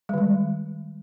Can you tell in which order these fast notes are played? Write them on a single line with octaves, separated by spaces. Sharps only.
G3 D#3 G#3